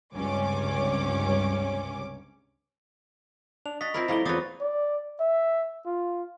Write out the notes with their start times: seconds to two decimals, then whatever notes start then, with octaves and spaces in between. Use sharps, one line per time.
0.14 C#2 G2 C3 C#4 D6
3.66 D4 F7
3.81 F#4 D#5 A6 B6
3.94 C4 E4 F4 A#4 B5 A#6
4.08 F3 G3 A3 E4 A#5 G7
4.25 E2 C4 F4 B4 C#5 D6 D#6 A6
4.61 D5
5.20 E5
5.86 F4